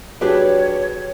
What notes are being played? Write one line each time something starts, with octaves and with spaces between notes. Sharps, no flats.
F#3 D4 G4 G#4 B4 C#5 D5